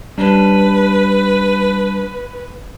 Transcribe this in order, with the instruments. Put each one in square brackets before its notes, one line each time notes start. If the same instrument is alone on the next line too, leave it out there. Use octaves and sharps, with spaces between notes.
[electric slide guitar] G3 C#4 D4 [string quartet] B4